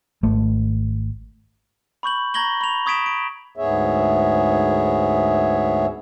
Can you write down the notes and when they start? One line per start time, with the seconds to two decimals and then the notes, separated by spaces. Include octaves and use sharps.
0.23 G#1 A3
2.03 B5 C#6 G6 F#7
2.34 A#5 C#6 G#6 A#6 F#7 G7
2.61 B5 F7
2.86 C#6 D#6 G#6 B6 D7 E7
3.06 D7
3.57 D2 G#2 B3 G#4 C#5 E5